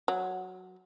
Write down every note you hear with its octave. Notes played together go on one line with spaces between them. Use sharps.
F#3